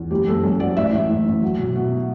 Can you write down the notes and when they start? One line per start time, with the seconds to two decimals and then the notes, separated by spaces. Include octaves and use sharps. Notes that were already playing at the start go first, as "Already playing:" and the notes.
Already playing: E2
0.11 F#1 G4
0.27 F#1 A4
0.44 F#2
0.60 F#3 D5
0.76 A1 E5
0.93 A1
1.10 A1
1.26 A1
1.42 F#3
1.59 B2
1.75 B2